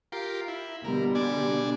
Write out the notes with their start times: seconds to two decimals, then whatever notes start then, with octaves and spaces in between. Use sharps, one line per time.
0.12 F4 G4 A#4
0.48 E4
0.84 B2 D3 G3 A#4
1.15 D4 D5 G#5